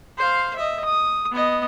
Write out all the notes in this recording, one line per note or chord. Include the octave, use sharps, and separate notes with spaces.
C5 F5
D#5 E5
D#6
B3 D#5